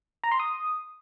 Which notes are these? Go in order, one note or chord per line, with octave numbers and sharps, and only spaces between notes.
A#5
C6
D#6